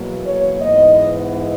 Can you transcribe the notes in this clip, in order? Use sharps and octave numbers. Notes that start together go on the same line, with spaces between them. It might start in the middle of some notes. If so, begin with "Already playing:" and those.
Already playing: E2 B2 F#3 A#3
C#5
G#2 E3 B3 D#5